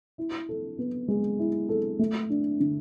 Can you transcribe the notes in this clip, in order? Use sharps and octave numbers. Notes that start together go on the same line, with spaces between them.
E4
A4
B3
G#3
E4
A4
A3
D4
D3